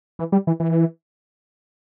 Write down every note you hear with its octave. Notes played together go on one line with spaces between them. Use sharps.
E3
G3
E3
E3